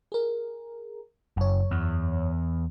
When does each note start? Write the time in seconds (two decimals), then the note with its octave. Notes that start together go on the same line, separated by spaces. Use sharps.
0.12 G#4 A#4
1.37 F#1 F#2 C#5
1.71 E2